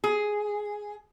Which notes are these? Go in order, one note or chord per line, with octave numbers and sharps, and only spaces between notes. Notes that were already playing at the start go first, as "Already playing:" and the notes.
G#4